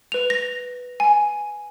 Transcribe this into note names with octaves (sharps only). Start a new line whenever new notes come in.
B4 F7
A#6
G#5